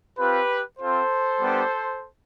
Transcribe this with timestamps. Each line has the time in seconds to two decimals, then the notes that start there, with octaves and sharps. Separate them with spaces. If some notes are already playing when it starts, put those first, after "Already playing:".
0.18 C4 F4 G4 B4
0.79 C4 F4 A4 C5
1.40 G3 B3 D4 G4